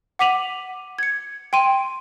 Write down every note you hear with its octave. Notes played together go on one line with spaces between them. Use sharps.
F#5 D6 B6 D#7 F7 F#7
G#6 C#7
G5 C6 D#7